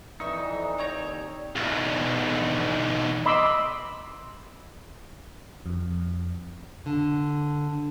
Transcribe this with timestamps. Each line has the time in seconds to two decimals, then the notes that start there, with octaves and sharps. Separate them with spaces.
0.20 F2 E3 D#4 D5 E5 C#6
0.78 D#2 C4 C#5 A#5
1.56 B1 E2
3.26 D#5 B5 C6 D6 E6
5.66 F2
6.86 D3